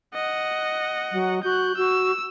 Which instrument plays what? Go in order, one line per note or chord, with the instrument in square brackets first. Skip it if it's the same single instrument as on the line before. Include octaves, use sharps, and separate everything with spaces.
[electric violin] D#5 F#5
[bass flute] F#3
[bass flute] F#4 [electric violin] F#6 G6
[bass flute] F#4 [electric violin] E6